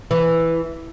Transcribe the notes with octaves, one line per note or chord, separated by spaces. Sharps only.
E3